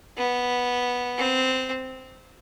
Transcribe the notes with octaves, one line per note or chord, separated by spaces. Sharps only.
B3
C4